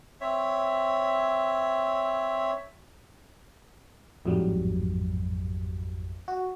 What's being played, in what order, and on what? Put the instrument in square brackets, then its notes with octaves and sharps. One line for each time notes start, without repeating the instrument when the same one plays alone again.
[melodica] C4 C#5 E5
[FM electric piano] A1 F2 G#2 F#3 G3
F#4